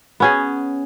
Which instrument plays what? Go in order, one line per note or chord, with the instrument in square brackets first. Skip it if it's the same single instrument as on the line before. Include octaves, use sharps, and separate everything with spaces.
[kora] B3 C#4 G#4